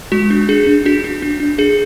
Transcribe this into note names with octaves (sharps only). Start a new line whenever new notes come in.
G#3 F#4
D4
D4 G#4
D4
D4 F#4
D4
D4
D4
D4 G#4